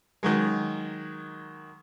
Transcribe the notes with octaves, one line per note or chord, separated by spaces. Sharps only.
D#3 F#3 G#3